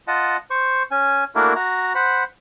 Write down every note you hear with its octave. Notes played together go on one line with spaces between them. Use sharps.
F4 D#5 F#5 A5
C5 C#6
C#4 G#5
A3 A#3 D4 E4 F#4 A#4
F#4 A#5
C5 F#5 B5